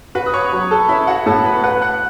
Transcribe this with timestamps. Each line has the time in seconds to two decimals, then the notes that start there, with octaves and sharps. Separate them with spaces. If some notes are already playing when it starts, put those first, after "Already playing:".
0.15 F#4 B4 B5
0.26 D#6
0.34 C#5 C#6
0.53 F#3
0.71 A4 A5
0.89 C#4 E4 E5
1.07 F#4 F#5
1.26 A2 A4 A5
1.45 B4 B5
1.64 B4 F#5 F#6
1.82 F#5 F#6